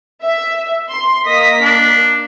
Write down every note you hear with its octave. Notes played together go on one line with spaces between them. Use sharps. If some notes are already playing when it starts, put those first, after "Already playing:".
E5
C6
A#3 D#5 B6
D4